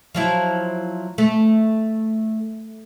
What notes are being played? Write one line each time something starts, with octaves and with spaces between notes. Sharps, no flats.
F3 F#3 E4
A3